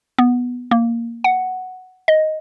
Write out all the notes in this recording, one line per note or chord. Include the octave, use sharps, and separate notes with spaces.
B3
A#3
F#5
D#5